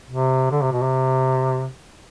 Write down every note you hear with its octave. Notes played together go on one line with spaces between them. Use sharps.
C3
D3
C3
B2
C3